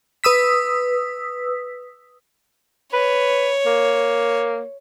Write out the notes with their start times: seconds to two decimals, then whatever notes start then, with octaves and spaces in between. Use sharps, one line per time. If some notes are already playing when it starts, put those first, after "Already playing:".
0.24 B4 D#6 E6 B6
2.93 B4 C#5
3.66 A#3